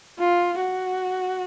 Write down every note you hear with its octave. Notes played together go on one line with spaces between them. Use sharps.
F4
F#4